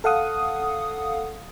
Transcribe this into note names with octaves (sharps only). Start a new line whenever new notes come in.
A4 F5 F#5 D#6